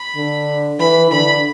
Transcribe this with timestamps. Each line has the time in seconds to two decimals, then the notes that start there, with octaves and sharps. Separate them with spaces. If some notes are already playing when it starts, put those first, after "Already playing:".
Already playing: B5
0.16 D3
0.79 E3 B5
1.11 D3 B5